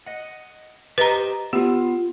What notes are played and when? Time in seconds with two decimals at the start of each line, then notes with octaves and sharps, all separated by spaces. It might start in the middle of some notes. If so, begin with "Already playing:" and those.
0.06 D#5 F#5
0.98 G4 B4 C5 D#5 A#5
1.53 B3 F4 G4